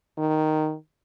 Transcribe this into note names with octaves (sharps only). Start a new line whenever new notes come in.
D#3